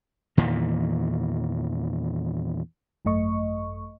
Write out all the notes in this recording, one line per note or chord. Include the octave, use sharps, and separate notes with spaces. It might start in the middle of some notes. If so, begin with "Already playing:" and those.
E2 A#2 D#3 E3
G#1 F#2 A3 D#5 C#6